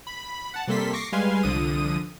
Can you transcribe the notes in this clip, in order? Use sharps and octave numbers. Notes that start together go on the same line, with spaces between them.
B5
F#5 A5
C3 G3 A#3 A4 C6 B6
C#6 D6 A#6 C7
G3 G#3 B4 F5 G#5 C6
C2 D3 F3 D#6 D#7